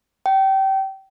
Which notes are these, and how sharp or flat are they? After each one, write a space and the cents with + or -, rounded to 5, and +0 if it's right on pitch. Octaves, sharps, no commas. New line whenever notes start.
G5 -25